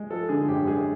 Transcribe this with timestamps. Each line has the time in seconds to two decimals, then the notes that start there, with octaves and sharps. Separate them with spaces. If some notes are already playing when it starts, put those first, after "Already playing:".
Already playing: G#3
0.10 F3 A4
0.29 D3 G#4
0.48 F#2 G4
0.67 G#3 G#4